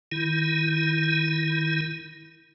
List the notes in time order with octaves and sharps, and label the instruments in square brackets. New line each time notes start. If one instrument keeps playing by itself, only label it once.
[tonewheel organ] D#3 E4